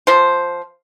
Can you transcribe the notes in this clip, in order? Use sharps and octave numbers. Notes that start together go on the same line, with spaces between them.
F3 C5